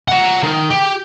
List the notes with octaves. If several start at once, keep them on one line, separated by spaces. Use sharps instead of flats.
F#5 A#5
D#3
G4